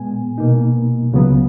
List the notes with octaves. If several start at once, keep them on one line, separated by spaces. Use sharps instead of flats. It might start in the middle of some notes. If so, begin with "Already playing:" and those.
Already playing: A#2 G#3 B3 G#5
B2 A#3 D#4
C#2 C#3 F#3 B3